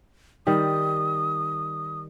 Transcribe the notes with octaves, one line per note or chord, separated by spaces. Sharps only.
D#3 G3 D#6